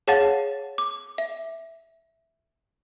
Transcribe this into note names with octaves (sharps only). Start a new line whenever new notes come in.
G#4 C#5 F5 F#5 A5 A6
D6
E5